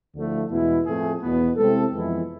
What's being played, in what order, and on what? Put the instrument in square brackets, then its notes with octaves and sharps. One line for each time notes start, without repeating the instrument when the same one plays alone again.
[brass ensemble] D2 D3 F3 A3 E4
E2 B2 G#3 B3 E4
A2 F3 A3 C4 G#4
E2 B2 B3
C3 G#3 C4 E4 A4
F2 E3 G#3 B3 E4